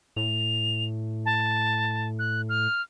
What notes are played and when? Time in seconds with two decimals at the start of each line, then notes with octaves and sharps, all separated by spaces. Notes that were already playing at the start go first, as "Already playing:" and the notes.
0.17 A2 F7
1.26 A5
2.19 F#6
2.49 F6